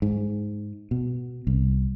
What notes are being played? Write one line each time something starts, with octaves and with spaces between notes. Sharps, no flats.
G#2
B2
C2